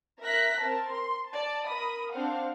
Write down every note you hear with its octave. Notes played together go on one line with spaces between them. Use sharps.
A#4 E5 F#6 A#6 B6
C4 A#4 A5
C6
D5 A5
A#4 B5 D#6
C4 D4 C5 F5 F#5